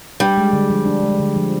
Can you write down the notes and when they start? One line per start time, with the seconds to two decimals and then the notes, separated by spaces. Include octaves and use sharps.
0.20 G3 D4
0.38 G#3
0.53 D3
0.70 F3
0.86 D4
1.03 G#3
1.20 D3
1.36 F3